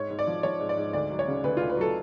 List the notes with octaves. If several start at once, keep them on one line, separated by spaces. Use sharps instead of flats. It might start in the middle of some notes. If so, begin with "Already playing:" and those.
Already playing: G#2 C#5
G#2
D5
F3
F3 C#5
G#2
D5
G#2
D2 D5
F#3
C#5
C#3
D2 B4
D2 F4
B4
F#3 A4